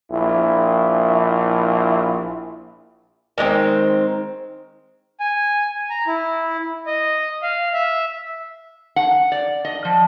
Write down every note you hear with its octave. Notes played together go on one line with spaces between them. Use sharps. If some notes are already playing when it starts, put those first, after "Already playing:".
A#1 E4
D#3 G#3 A3 C4
G#5
A#5
E4
D#5
F5
E5
F#5
D5
D#5
F3